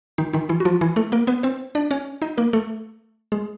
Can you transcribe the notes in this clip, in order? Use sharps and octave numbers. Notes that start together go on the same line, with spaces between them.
D#3 D#4
D#3 D#4
E3 E4
F#4
F3 F4
E3 E4
A3 A4
A#3 A#4
B3 B4
C4 C5
D4 D5
C#4 C#5
D#4 D#5
A#3 A#4
A3 A4
G#3 G#4